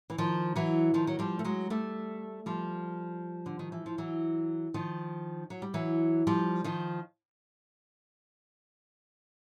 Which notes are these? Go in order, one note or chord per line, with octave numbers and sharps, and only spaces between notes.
E3
D#3 F3
E3 F#3
D#3 F3
F#3
F3 G3
A3
F#3 G#3
G3 A3
F3 G3
D3
D#3
E3
F3
E3 F#3
D#3 F3
F#3
G3
E3 F#3
F3 G3
D#3 F3